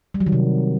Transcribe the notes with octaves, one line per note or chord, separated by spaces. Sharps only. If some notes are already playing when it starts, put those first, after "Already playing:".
G3
F#3
D#3
C3